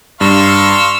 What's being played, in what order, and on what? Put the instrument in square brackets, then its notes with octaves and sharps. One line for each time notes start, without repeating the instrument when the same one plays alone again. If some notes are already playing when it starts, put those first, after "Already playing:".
[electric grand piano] G2 [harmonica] F5 C6 C#6 [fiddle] E6